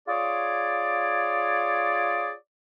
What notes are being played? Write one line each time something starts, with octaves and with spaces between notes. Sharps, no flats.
F4 G#4 C#5 D5